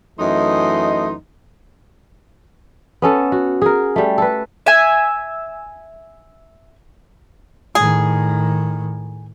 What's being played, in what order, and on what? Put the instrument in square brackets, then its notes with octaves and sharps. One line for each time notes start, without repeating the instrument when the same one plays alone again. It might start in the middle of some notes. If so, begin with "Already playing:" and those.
[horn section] F#2 E3 A3 D#4 D#5 C6
[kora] B3 C#4 A4
F#4
G#4 A#4
G3 A3
A4 B4
[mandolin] E5 G#5
[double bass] A2 D#3 [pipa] G#4